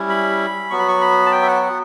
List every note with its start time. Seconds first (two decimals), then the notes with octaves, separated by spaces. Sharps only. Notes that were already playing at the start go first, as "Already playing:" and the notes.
Already playing: G3 C#4 E4
0.09 B5
0.70 F#3 B3 F#4 C#6
0.79 B5
0.88 C#6
1.01 B5
1.26 A5
1.32 G5
1.42 E5
1.47 F#5
1.62 F#5